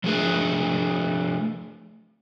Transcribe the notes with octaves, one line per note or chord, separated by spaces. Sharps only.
F3 A3 D4 G#4 B4